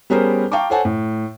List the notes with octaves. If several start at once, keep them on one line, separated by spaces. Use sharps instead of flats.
G3 B3 C#4 G#4 A#4 C5
F5 G5 A5 A#5 C#6 D6
A4 C5 C#5 F#5 G#5 A5
A2